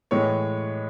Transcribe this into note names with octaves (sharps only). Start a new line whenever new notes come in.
A2 E3 G#3 C#5